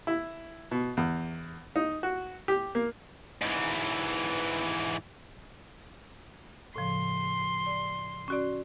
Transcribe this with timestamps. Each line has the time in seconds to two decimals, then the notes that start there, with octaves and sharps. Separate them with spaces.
0.07 E4
0.71 B2
0.97 E2
1.76 D#4
2.03 F#4
2.48 G4
2.75 A#3
3.42 G#2 E3
6.76 A2 C#3 F3 C6
7.66 D5
8.28 C#4 F#4 D5